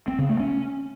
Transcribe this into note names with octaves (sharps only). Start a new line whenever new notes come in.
C4
C#3
A3
C#4